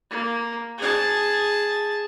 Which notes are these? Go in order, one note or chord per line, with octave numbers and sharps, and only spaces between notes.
A#3
G#4 A5